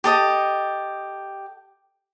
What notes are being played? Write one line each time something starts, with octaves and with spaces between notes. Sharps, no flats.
G4 A4 D#5